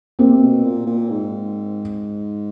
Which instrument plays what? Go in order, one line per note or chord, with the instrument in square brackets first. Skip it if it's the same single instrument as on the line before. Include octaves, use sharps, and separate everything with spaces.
[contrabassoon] C3 [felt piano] A#3 C4
[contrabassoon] B2
A#2
A#2
G#2